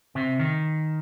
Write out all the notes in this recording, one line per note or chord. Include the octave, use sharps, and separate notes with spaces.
C3
D#3